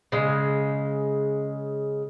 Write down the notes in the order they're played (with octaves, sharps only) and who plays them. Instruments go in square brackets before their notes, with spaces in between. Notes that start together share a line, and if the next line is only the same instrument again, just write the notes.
[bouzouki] C#3 G#3